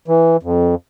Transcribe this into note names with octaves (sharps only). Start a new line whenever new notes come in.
E3
F2